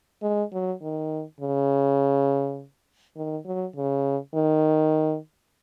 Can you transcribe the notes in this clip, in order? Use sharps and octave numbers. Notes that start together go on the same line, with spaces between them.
G#3
F#3
D#3
C#3
D#3
F#3
C#3
D#3